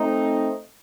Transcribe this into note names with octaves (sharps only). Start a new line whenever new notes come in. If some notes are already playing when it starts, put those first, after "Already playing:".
Already playing: A3 C4 D#4